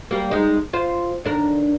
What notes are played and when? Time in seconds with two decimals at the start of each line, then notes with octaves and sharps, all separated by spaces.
0.11 G3 A#3
0.31 G#3 D#4
0.73 F4 C5
1.25 D#2 D4 A#4